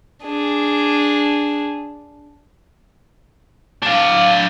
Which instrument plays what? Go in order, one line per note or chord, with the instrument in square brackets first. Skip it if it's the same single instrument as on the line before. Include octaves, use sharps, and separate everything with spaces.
[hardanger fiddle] D4 G#4
[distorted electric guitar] D4 F5